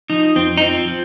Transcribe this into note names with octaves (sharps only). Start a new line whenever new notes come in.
F3 D#4
F2 C4
D#4
F3 C4
F3